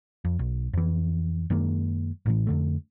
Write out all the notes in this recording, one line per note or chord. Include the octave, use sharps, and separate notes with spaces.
F2
B1
F2 E3
F#2 D#3 G#3 A#3
A1 A2 E3
F2 D3 A3